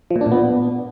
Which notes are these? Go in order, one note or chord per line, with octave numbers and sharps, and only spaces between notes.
F3
A#2
D4
A#2
B3